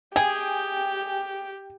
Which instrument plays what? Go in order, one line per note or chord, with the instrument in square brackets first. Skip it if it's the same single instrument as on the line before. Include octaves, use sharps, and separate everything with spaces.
[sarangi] G4 [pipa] G#4 [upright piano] G5 [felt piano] G#5